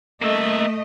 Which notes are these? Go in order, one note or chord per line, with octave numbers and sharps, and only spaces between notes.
A3 A#3 D#5 E5